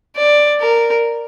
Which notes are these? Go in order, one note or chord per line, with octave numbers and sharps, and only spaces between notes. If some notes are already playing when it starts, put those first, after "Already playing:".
D5
A#4